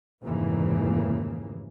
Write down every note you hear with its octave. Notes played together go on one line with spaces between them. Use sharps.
F1 D#2 G#2 C#3 E3 A#3